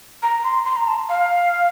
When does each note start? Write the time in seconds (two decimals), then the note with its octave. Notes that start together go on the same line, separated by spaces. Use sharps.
0.23 A#5
0.44 C6
0.65 C6
0.76 A#5
0.87 A5
1.09 F5